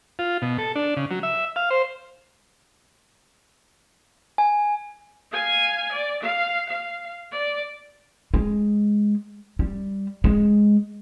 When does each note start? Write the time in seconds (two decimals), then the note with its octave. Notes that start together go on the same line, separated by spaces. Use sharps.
0.19 F4
0.42 B2
0.58 A4
0.75 D4
0.97 C#3
1.11 F#3
1.23 E5
1.56 F5
1.70 C5
4.38 G#5
5.33 F5 G#5
5.92 D5
6.23 F5
6.69 F5
7.32 D5
8.34 G#3
9.59 G3
10.24 G#3